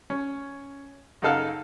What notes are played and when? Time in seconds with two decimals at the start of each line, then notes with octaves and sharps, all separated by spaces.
0.10 C#4
1.22 F#2 C#3 D#4 A4 F5 F#5